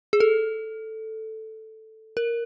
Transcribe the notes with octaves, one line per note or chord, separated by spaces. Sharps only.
G#4
A4
A#4